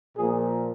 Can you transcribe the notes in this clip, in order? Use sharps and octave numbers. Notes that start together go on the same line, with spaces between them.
A#2 F3 A#3 G#4